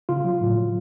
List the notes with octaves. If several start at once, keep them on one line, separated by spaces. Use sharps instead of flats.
C#3 F4
F#3
A2
F#3